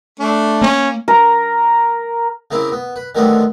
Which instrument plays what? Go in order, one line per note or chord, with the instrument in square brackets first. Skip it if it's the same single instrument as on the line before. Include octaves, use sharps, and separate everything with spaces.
[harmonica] A3 D4
[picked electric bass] A#3 [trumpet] C#4
[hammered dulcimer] A#4
[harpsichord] C#3 A#3 C4 E4
B3
B4
D3 D#3 G3 A3 B3 C4